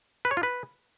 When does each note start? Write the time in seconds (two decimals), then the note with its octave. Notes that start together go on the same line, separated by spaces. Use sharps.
0.25 B4
0.31 C#5
0.37 F4
0.43 B4